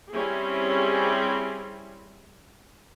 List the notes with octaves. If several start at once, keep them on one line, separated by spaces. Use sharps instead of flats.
G3 C4 C#4 E4 G#4